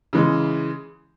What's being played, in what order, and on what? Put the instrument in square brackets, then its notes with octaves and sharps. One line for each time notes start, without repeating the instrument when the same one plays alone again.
[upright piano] C#3 E3 G#3